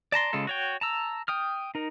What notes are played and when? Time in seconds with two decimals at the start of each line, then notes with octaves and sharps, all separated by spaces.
0.12 D5 A5 A#5 C6
0.33 C#3 G#3 F4 A4
0.47 F#4 C#5 G5
0.81 A5 A#5 E6
1.28 G5 D#6 F6
1.75 D#4 A#4